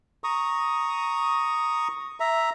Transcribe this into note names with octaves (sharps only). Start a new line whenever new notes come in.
A#5 C#6 D#6
E5 A#5